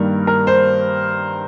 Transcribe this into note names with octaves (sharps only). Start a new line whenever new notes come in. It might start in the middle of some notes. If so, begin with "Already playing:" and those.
Already playing: G2 D#3 G3 A#3 A#4
A#4
C5